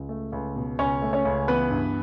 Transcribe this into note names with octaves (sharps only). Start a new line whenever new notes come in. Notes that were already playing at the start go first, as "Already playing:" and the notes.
Already playing: C#2
A3
C#2
B2
C#2 C#4 C#5
A3
C#4 C#5
C#2
E3 B3 B4
G2